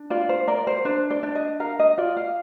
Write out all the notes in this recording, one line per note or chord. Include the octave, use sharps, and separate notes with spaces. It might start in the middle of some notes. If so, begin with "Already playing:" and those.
Already playing: D4
F4 D5
C5
A#4 D5
C5
D4 C5
D5
D4
D#5
A#4 F5
D#5
F4 D5
F5